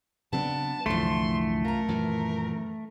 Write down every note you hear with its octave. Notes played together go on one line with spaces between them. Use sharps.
C#3 F#3 B3 C4 D4 A5
C2 F#2 D3 E3 F3 A3 C6
F4 A#4 A#5
F#2 A#2 D#3 E3